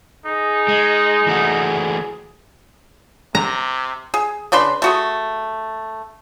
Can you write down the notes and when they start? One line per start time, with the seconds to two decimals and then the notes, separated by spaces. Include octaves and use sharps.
0.26 D#4 G#4
0.68 G#3
1.27 E3 A3 F#4
3.35 C3 A#5
4.14 G#4
4.52 C#3 D4 B4 C6
4.82 A3 F#4 G#4